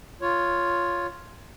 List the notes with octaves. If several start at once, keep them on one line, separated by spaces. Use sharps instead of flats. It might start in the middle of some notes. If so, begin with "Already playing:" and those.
F4 C#5